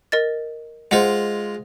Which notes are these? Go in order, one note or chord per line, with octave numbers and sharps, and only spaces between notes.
A#4 D#5 A6
G#3 F4 C5 D#5 F#5